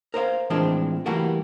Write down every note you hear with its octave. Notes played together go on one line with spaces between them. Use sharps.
A#4 C5 D5 F5
A2 E3 F3 G#3 C4 D4
E3 G3 A3 A#3 F#4 A#4